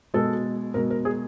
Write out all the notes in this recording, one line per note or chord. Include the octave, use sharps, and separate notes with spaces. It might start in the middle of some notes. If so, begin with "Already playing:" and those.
B2 G#3 A4
B2 G#3 A#4
A#4
G#4